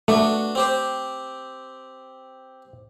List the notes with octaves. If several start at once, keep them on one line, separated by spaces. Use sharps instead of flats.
A3 B3 D4 F#4
C4 G4 C5